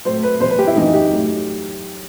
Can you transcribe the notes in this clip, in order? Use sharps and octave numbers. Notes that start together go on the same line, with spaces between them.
A2 F#3 C5
B4
E2 B2 F#3 C5
B4
G4
E4
F#2 E3 D#4
G4
A2 F#3